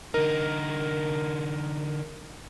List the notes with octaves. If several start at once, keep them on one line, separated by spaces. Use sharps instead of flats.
D3 D#4 A#4